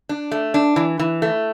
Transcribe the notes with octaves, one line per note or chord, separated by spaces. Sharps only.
D4
A3
D4
E3
E3
A3